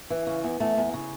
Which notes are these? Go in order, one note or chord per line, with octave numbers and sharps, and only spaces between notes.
E3
C#3
E2
E2 A3
E2
C#3